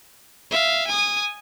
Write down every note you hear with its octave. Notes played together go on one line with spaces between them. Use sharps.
E5 F5
G#5 D#6